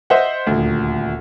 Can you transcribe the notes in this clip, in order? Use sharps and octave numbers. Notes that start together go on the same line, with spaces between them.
C5 D#5 E5 F#5
D#1 D2